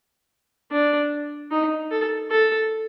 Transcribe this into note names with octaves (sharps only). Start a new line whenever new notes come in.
D4
D#4
A4
A4